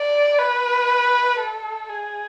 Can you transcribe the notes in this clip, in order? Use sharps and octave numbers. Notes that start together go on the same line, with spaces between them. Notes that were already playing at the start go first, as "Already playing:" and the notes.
Already playing: D5
B4
A4
G#4